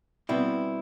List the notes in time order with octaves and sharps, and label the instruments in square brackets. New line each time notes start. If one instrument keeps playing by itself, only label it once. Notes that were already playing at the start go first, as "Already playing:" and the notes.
[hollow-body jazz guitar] B2 G3 B3 C4 E4